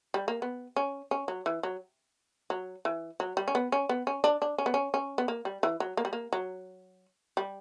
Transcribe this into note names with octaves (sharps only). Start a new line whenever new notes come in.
G3
A#3
B3
C#4
C#4
F#3
E3
F#3
F#3
E3
F#3
G3
C#4
B3
C#4
B3
C#4
D4
D4
C#4
B3
C#4
C#4
B3
A#3
G3
E3
F#3
A#3
G3
A#3
F#3
G3